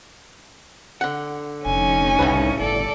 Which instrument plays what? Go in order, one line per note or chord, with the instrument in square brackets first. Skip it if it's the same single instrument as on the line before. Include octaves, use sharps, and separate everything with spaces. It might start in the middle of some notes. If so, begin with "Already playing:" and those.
[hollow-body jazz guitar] D3 F#5
[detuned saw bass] F1 [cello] C#4 D#4 [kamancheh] G#5
[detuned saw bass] C2 [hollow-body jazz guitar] A2 C#3 B4
[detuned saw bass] G1 [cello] A4 D5